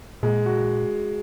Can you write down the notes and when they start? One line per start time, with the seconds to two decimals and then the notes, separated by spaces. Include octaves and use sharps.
0.23 A#2 G#3
0.46 F#4